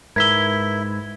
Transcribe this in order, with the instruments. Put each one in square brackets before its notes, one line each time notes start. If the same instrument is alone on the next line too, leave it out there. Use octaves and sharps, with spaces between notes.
[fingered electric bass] G#2 [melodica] E4 [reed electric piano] A#4 B4 E6 [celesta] G#6 B6 G7